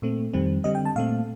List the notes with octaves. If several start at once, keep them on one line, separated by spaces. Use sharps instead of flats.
A#2 A3 C4
F2 D#3 G3 C4
D3 G3 C4 D#5
G5
A5
A#2 A3 C4 F5